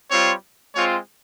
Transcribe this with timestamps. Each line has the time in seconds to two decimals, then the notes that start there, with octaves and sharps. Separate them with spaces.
0.11 G3 C4 F4 C#5
0.75 G#3 C4 F4 C#5